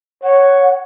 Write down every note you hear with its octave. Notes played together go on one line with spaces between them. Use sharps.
C#5 F#5